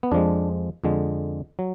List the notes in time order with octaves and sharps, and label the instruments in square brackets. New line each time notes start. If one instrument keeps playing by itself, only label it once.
[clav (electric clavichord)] B3
F2 F3 G#3 D4
F2 D3 G#3
F#3